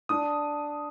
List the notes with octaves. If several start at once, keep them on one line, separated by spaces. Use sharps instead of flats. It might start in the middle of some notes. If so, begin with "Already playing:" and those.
D4 D#6